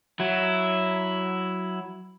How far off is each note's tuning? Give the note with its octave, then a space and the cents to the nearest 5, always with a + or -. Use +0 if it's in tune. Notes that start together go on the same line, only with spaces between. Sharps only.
F#3 +0 E4 +0